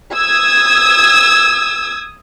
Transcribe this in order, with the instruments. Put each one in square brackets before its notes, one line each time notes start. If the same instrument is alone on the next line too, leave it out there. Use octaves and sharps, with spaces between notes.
[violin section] D#6 E6 G#6